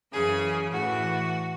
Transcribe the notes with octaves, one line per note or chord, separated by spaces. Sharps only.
F#2 C#3 E3 G#4
A2 E3 F#4